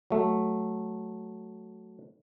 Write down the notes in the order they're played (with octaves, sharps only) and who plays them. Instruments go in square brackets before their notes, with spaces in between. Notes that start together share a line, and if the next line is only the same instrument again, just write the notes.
[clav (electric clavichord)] F#3 A3